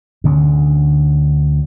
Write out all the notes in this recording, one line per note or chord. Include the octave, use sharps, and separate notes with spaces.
D2 D3 A#3 C#4